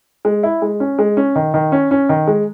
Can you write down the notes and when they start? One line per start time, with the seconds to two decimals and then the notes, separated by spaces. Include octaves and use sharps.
0.25 G#3
0.43 E4
0.62 G#3
0.80 C#4
0.99 G#3
1.17 C#4
1.35 D#3
1.54 D#3
1.72 C#4
1.91 C#4
2.09 D#3
2.27 G#3